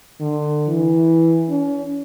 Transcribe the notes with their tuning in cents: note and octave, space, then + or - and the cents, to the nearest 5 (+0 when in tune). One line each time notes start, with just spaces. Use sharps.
D3 +30
E3 -5
C#4 +35